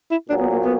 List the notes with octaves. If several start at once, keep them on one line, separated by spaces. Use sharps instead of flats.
E4
A#1 A#2 F#3 D4
B3
A#3
B3